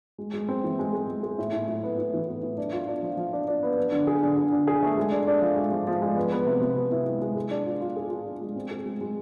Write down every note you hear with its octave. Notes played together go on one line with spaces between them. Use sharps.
G#3
G#3
C4
E3
G#3
G#4
G#3
G#4
A2
A2
A2
B3
A2
E3
B3
A2
D4
F4
D4
F3
F3
D4
D4
B3
D4
D3
G#4
D3
D3
D3
G#4
A3
G#3
D4
D4
F3
G#3
F3
F3
G#3
B3
B3
C3
C3
B3
E4
G#3
G#3
G#4
D4
F4
F4
G#4
F4
D4
G#3
C4
G#4
G#3
G#3